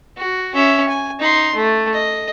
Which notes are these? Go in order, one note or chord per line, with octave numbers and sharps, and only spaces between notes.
F#4
C#4 E5
G#5
D#4 C6
A3
D#5